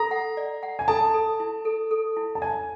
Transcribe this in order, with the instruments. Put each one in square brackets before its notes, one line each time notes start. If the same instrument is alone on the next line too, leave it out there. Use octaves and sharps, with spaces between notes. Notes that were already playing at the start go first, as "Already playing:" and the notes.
Already playing: [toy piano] A4 [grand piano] A#5
[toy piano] F#5
D5
F#5
[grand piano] G#5
[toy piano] A4 [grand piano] A5
[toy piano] A4
E4
A4
A4
E4
[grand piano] A5
[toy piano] C#5 [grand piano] G#5